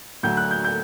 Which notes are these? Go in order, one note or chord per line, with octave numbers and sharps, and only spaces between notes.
D2 D3 F#3 G6
F#6
G6
G6